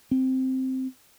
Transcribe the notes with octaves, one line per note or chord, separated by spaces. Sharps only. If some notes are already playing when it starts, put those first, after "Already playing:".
C4